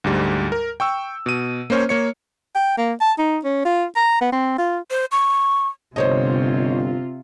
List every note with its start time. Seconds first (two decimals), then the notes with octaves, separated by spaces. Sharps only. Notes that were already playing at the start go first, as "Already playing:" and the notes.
0.04 D2 G#2 G3
0.52 A#4
0.80 G5 C#6 E6
1.26 B2 D#7
1.70 A#3 C#4 C5 C#5
1.89 A#3 C#5 C#7
2.56 G5
2.78 A#3
3.01 A5
3.18 D#4
3.44 C#4
3.65 F4
3.96 A#5
4.21 B3
4.33 C4
4.59 F4
4.90 C5
5.12 C#6
5.96 G1 C3 F4 C5 C#5 D#5